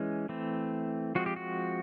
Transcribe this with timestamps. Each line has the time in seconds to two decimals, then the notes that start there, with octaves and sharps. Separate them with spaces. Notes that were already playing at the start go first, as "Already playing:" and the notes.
Already playing: E3 G#3 C#4
0.29 E3 A3 C4
1.15 F3 G#3 C4 F#4
1.26 G4
1.36 F#4